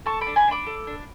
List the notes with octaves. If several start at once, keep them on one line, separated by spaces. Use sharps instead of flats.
A4 A5 C#6
B5 D6
D4
G#5 B5
D4 B5 D6
A4
D4